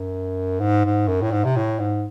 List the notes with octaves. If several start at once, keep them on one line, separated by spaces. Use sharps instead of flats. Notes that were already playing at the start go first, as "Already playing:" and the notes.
Already playing: F#2
G#2
G#2
F#2
A2
G#2
C3
A2
G#2